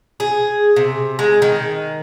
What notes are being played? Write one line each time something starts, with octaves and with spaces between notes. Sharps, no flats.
G#4
C3
G#3
D#3